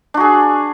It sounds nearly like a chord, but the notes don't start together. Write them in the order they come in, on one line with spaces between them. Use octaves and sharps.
D4 F#4 G#4